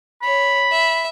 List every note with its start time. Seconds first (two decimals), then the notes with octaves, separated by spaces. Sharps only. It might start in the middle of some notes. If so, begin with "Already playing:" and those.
0.22 C#5 B5
0.72 E5